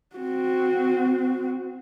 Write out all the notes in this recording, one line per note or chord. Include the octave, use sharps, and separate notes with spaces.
C4 F#4